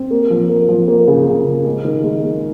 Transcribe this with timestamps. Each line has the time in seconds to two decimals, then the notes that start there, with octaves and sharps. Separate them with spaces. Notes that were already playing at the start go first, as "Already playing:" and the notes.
Already playing: C4
0.11 A#3
0.30 F3
0.49 A#3
0.69 F3
0.88 A#3
1.07 C#3
1.27 C#3
1.46 C#3
1.66 G#3
1.85 D#3
2.04 G#3
2.23 G#3